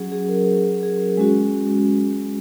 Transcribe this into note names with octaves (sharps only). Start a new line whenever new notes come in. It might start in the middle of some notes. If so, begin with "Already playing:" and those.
Already playing: F#3 C#4 F#4 G#4
G#4
A#4
G#4
G#3 C#4 F#4